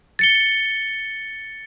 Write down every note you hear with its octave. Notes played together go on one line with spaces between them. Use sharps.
A6 C#7 G7